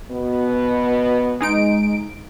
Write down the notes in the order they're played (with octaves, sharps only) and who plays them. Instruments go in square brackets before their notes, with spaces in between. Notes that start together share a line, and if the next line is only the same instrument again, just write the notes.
[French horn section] B2 B3
[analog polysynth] G#3 D#4 D7